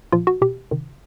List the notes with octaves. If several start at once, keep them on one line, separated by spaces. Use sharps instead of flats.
A#2 F3 F4
F#4
B2 G4
C3 D#3